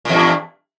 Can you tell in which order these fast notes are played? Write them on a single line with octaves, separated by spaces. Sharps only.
A#2 E2 G2